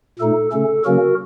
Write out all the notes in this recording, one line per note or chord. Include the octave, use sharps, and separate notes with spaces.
A#2 A3 D#4 A4
C#3 A3 C#4 A4
C#3 F#3 A#3 C#4 F#4 A#4